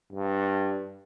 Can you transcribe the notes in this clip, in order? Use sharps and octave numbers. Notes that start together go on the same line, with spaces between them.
G2